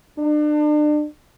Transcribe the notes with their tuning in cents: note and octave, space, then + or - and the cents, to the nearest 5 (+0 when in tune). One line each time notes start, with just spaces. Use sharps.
D4 +35